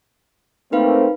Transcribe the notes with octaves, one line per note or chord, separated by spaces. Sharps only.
A3 A#3 C4 D#4 B4 F5